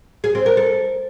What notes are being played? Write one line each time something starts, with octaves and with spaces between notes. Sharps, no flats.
G#4
C4
A#4
A4